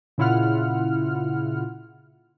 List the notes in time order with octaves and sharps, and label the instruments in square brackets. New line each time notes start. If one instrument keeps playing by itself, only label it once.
[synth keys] A#2 C#3 E4 F4 F#5 F6